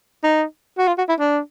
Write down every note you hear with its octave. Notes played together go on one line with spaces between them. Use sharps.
D#4
F#4
F4
F#4
E4
D4